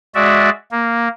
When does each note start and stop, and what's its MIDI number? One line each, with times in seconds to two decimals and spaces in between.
0.15 0.50 56
0.15 0.50 66
0.15 0.50 74
0.15 0.50 76
0.71 1.08 58